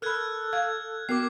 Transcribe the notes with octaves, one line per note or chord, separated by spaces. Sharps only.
A4 A#4 B5 F6 F#6 G#6
F5 G#6
B3 F#4 A#4 D6 C7